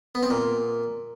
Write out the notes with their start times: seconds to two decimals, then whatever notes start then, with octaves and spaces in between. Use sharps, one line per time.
0.15 B3
0.23 C4
0.30 A#2